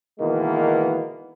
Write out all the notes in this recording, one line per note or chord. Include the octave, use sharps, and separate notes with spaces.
B2 D#3 E3 G#3 A#3 B3